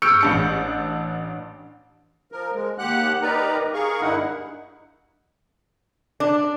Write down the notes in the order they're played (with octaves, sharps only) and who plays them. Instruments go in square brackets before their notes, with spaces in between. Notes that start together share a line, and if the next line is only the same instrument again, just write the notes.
[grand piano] C#6 E6 F6 G6 C#7 D7
A1 D4 C#7
[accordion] F3 A#4
G#3
D#2 G4 F#5 F#6
D#4 G4 A#4 B4 D5 A#5
G#4 A#4 F5 C#6
G2 D3 D#4 E4 F#5
[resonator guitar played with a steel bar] D4